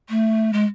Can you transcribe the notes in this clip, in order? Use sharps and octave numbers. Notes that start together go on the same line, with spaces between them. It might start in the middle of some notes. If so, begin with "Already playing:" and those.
A3
G#3